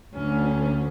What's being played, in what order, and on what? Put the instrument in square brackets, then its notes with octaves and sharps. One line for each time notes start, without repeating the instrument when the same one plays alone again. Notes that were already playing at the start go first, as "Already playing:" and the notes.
[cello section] D2 [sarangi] C#4